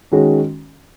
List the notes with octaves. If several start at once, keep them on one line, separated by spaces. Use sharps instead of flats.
D#3 G#3 C#4 F#4